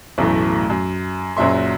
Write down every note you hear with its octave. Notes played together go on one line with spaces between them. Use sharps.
B1 F#2 A2 E3 A3
F#2
F#1 F#2 A#2 F#3 E5 C6